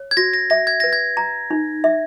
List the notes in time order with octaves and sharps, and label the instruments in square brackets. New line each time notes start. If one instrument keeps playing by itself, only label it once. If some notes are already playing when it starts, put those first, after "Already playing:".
Already playing: [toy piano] C#5
[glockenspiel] G#6
[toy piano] F#4 [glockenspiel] A#6
[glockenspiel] A#6
[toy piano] E5 [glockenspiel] A#6
[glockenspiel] G#6
[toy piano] B4 [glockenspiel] A#6
[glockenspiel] G#6
[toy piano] A#5
D#4
E5